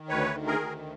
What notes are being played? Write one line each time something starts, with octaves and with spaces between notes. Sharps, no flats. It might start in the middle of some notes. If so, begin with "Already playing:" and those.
Already playing: D#3
D2 B4 C#5
D#3
G#4 A#4
D2